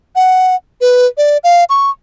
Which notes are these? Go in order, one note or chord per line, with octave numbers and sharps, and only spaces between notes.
F#5
B4
D5
F5
C#6